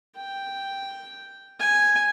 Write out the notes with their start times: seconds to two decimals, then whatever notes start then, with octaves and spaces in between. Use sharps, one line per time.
0.16 G5
1.60 G#5